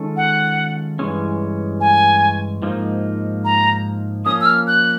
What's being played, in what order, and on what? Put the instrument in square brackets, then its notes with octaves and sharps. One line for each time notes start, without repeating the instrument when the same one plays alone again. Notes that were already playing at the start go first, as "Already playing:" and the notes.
Already playing: [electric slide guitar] D#3 G#3 C#4 F4 A4
[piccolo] F#5
[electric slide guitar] G2 E3 G#3 C#4
[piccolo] G#5
[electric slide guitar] G#2 F3 A#3 D#4
[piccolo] A#5
[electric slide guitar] F3 A#3 C#4 [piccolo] D#6
[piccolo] E6
F6
F#6